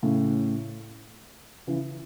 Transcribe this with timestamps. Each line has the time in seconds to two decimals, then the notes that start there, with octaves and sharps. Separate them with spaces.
0.02 A2 C#3
1.67 C#3 E3